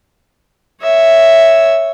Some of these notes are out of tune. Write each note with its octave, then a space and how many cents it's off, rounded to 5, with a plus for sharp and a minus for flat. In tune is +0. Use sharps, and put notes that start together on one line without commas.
C#5 +0 E5 +0